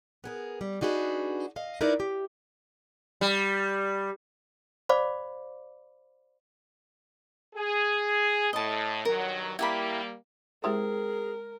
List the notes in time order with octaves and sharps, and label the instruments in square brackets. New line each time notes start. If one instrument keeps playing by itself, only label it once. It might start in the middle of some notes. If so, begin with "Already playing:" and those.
[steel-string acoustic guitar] B3 G#4 A#4
G3
D4 D#4 F#4 G#4 B4
D#5 F5
D#4 E4 A#4 B4 D5
G4
[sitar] G3
[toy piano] C5 D5 F5 B5 D6
[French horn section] G#4
[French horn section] A2 [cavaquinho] D#5 A5
[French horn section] G2 D#3 F#3 [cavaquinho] A#4
[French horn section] G3 A#3 [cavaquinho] E4 G4 B5
[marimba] G#3 D#6 [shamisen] C4 E4 G4 [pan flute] G#4 [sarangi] A#4